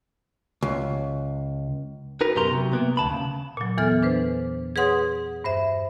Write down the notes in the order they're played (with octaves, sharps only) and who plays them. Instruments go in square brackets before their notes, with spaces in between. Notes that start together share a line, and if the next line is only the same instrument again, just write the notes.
[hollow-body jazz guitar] C#2
[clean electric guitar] D#4 F#4 A#4 B4
F#2 B2 G4 A#4 A#5 C6
C3 F#3
C3 A#3 B3
D2 A5 B5
C#3
[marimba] A#2 F#3
E2 E3 B3 A4 F6
D4 B4 C5
G#4 B4 C#5 F#5 C6 D#6
G2 C5 E5